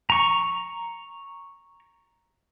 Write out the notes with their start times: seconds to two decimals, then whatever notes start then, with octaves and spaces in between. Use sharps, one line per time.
0.10 A#5 C#6